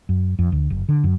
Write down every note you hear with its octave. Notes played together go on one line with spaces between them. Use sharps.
F#2
F2
D2
F#1
D3
F#2